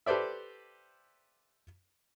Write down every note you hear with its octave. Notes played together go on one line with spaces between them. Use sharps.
G4 A4 B4 C5 D5 E5